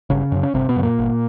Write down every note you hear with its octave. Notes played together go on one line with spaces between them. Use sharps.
G1 C#3 C#4
F#2 C#3
C#4
G1 C3 C4
B2 B3
F#2 C#3
A#2 A#3
G1